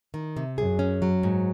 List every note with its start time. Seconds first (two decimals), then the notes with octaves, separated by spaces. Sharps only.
0.14 D#3
0.36 C3
0.58 F#2 G#4
0.79 C#4
1.02 F#3
1.23 G#2